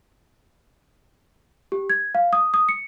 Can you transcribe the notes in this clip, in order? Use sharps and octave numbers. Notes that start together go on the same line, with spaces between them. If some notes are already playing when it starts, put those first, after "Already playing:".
G4
G#6
F5
D#6
D#6
C#7